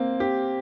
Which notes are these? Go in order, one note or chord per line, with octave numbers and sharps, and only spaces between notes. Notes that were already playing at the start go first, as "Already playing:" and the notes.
Already playing: A#3 C4
G4